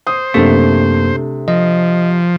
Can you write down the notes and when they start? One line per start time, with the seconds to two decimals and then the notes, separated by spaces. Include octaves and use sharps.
0.07 C5 D#6
0.34 F#2 C3 A3 A#3 D4
1.48 F3 D#5